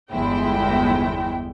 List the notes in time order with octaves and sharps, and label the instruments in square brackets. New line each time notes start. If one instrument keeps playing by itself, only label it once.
[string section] G1 E2 G#3 E4 G5